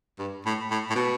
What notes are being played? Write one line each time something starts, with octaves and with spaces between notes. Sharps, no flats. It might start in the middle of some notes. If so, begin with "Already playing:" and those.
G2
A2
A2
A2
B2